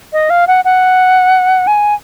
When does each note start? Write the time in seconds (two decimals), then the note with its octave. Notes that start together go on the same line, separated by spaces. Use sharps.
0.13 D#5
0.30 F5
0.48 F#5
0.65 F#5
1.67 G#5